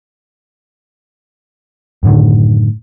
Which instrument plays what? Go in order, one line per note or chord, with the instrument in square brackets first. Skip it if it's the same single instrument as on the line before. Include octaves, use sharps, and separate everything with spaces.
[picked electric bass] F#2 A2 D3 D#3